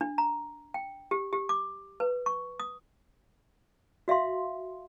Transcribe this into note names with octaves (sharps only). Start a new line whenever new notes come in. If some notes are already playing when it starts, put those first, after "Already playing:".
D4
A#5
G5
G4
G4
D6
B4
C#6
D#6
F#4 E5 F5 C6